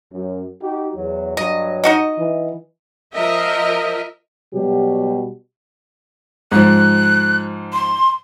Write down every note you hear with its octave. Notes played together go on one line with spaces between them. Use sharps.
F#2
D#4 F#4 G4
E2 F#3
G2 F#3 D#5
D#4 F#4 D#5
E3
F3 A#4 D#5 E5
B2 F#3 G3 F#4 G4
G#2 F3 F#6
C6